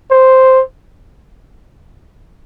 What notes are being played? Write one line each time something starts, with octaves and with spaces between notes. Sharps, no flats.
C5